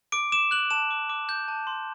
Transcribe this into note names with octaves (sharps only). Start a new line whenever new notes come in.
D6 D7
D6 E7
F#6 F#7
A5 E7
D6
D6
G6
A5
C6